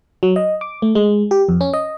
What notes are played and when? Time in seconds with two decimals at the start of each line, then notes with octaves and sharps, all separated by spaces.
0.23 F#3
0.36 D#5
0.61 D6
0.82 A3
0.95 G#3
1.31 G4
1.49 F2
1.61 C#4
1.74 D#5